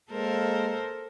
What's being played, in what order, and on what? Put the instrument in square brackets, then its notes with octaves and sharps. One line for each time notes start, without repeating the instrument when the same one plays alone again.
[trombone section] G#3 A#3 [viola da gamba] A4 A#4 C5